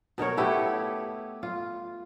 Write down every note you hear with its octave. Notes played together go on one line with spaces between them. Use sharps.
B2 D#4 A#4 C#5
A3 B3 E4 G4
F4